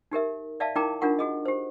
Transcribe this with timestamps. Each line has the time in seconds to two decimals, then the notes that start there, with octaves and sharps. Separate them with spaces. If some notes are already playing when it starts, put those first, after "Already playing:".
0.11 D#4 G4 A#4 E5
0.60 D5 E5 F5 A5
0.75 D#4 E4 A#4 G5 A#5 D6
1.01 D4 D#4 F4 A#4 F#5 C#6
1.19 F#4 G#4 D#5
1.45 G4 C5